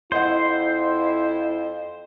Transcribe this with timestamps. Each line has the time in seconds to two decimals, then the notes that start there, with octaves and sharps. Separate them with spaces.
0.12 F2 E4 C5 D#5 F#5